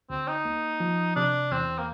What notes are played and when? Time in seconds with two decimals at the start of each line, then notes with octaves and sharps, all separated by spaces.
0.10 D2 C4
0.28 D#4
0.45 A#3
0.80 F3
1.16 C3 D4
1.52 E2 C4
1.79 A#3